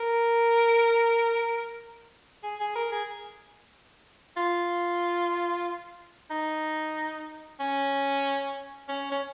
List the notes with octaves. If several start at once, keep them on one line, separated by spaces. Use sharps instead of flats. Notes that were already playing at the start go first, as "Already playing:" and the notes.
Already playing: A#4
G#4
G#4
A#4
G#4
F4
D#4
C#4
C#4
C#4